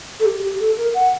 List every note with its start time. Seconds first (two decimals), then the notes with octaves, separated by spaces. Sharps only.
0.20 A4
0.26 G4
0.43 G4
0.60 A4
0.77 A#4
0.94 F#5